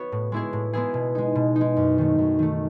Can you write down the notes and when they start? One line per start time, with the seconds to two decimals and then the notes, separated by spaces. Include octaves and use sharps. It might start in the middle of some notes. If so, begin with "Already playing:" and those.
Already playing: B3 F#4 C#5
0.12 A2
0.32 G#3 B3 E4 G#4
0.53 A2
0.73 G#3 B3 E4 G#4
0.94 B2
1.15 G#3 D#4
1.35 B2
1.56 D#4
1.61 G#3
1.77 F#2
1.98 D#3 A3
2.18 F#2
2.39 D#3 A3